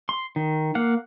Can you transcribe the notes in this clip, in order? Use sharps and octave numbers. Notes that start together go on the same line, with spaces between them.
C6
D#3
A#3 F5 F#5